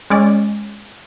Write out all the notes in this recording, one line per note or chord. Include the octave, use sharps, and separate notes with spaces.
G#3 C#4 D5